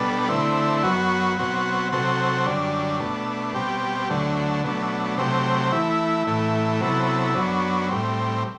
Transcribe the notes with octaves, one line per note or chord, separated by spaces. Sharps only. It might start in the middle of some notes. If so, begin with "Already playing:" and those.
Already playing: B2 G3 B3 D4 A4
D3 A3 C4 E4
F#2 F#3 B3 F#4
B2 F#3 C4 F#4
C3 F#3 C4 F#4 A4
F#2 D3 G3 D4
B2 A3 D4
B2 G3 C4 G4
D2 D3 F#3 A3
B2 F#3 A3 D4
C3 F#3 A3 C4 G4
E3 A3 E4
A2 E3 A3
C3 F#3 B3 E4 A4
F#2 F#3 B3 D4
A2 G3 C4